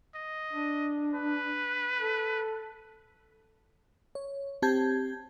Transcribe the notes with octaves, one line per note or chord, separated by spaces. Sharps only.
D#5
D4
B4
A4
C#5
C4 G4 A5 G6 G#6